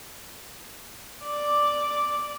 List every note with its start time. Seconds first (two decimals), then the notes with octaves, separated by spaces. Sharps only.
1.24 D5 D6